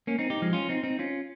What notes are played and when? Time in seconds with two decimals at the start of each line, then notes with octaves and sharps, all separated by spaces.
0.07 A#3 C#4
0.18 C4 D#4
0.30 D#4 G4
0.42 F3 G#3
0.53 C#4 F4
0.69 C4 D#4
0.83 C4 D#4
0.99 C#4 F4